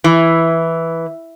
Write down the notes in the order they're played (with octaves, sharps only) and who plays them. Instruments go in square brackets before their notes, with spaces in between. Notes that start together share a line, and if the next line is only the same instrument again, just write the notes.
[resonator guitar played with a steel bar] E3